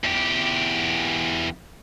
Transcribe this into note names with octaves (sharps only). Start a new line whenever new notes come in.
E2 G4